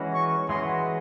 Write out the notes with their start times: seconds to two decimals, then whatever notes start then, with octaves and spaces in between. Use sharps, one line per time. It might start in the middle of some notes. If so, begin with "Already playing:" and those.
Already playing: E3 G#3 C#4 F#4 B4
0.14 C#6
0.49 E3 G#3 C#4 F#4 B4 C6